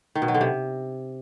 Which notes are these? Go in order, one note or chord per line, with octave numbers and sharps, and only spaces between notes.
D#3
B2
F#3
D3
C3